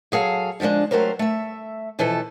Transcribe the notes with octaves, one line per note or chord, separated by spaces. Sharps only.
F#3 G#4 A4 F5
D3 F3 F#3 G#3 D4
F#3 A3 G4 A#4 C5
A3 E5
B2 E3 F3 A4